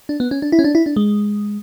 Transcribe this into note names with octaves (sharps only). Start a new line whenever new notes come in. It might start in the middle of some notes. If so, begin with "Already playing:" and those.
D4
B3
C#4
D4
E4
C#4
D4
E4
D4
G#3